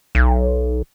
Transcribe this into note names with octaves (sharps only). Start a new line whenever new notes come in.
B1